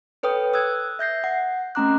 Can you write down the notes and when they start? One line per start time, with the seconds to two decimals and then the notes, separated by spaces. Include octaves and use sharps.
0.23 A4 B4 C#5 G5 D#6
0.54 D#6 E6 F#6 G#6
0.99 E5 G6 A#6 C7
1.24 F#5
1.75 A3 C4 C#4 A#5 D6 F#6